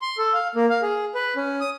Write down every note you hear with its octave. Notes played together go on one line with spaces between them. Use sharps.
C6
A4
F5
A#3
F5
G#4
B4
C#4
D#6